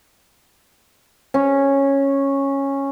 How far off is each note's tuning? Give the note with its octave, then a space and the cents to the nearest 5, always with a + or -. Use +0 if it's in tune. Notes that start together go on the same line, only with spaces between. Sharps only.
C#4 -10